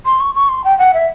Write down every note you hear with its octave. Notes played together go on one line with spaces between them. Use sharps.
C6
C#6
C#6
C6
G5
F#5
E5